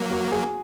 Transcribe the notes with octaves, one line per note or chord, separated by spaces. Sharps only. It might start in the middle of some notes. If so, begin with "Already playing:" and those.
Already playing: F#3 A#3
F#4
G#4